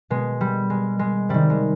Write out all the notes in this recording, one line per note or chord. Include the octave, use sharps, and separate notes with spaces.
B2 G#3
G3
G#3
G#3
C3 D#3 G3
G#3